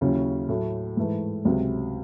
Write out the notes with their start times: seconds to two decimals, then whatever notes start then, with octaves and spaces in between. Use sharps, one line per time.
0.01 D#2 C#3 F#3 C#4 E4
0.48 A2 F#3 A3
0.97 G#2 E3 A3
1.45 C#2 C3 F#3